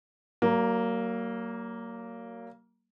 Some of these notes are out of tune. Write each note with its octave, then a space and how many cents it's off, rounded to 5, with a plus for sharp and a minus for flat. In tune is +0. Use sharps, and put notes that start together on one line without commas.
F#3 +40 A#3 -5